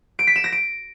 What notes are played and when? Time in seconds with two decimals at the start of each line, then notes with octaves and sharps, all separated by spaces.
0.19 D7
0.27 B6
0.36 E7
0.44 A#6
0.52 D7